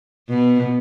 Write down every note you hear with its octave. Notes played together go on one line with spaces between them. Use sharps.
B2